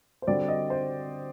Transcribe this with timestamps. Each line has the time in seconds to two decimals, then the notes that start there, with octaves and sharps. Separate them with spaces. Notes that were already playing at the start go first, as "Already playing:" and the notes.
0.22 C5
0.27 D3 G3 C4 F#4 D5
0.48 D#5
0.70 C5